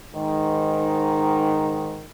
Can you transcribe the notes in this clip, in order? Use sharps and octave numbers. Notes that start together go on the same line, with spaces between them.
G#2 D#3